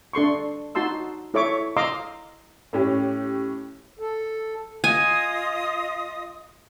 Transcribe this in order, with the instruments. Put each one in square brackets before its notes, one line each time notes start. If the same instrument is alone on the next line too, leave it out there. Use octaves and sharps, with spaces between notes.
[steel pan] D4 A4 C6 C#6
D#4 F#4 A5 C6 E6
E4 A4 C#5 E5 C#6 D6
D#5 F5 A#5 C6 D6 E6
[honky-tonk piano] A2 C#4 G4
[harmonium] A4
[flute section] F4 D#5 D#6 [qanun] G#5